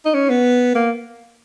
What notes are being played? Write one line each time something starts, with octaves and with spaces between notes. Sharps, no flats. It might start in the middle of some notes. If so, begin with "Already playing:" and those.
D#4
C#4
B3
A#3